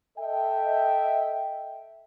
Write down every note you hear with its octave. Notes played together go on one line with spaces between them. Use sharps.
A4 D#5 E5 G5